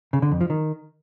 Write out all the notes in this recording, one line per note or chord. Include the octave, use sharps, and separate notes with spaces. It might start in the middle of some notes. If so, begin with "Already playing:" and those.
C#3
D3
F2
F3
D#3